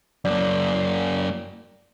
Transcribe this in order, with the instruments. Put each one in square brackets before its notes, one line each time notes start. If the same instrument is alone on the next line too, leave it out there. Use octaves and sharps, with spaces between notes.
[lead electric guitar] F#2 A#3 [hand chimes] D5